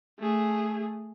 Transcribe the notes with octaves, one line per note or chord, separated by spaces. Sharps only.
A3 G#4